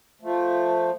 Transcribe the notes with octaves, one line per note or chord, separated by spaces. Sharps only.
F3 A3